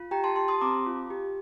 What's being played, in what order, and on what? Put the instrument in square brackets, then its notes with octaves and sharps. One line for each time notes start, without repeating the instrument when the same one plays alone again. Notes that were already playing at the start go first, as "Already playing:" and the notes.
Already playing: [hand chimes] F4
G4 G5 A#5
A5 C6
G4 A5 C6
C6 D#6
C4 A#5 D6
F4
G4